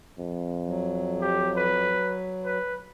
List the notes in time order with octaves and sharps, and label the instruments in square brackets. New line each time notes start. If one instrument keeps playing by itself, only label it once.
[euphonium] F2
[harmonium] F#3
[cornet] G4
B4
B4